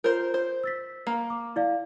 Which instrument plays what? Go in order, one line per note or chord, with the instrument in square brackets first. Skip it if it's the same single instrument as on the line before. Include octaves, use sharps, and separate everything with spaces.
[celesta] F4 G6 [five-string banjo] A#4 C5
[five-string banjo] C5
[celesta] E6 A6 B6
[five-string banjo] A#3
[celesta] D6
E4 D5 F5